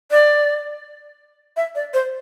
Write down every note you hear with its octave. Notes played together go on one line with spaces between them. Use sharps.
D5
E5
D5
C5